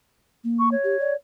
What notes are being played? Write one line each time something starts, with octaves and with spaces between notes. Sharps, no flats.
A#3
C#6
C#5
G4
D5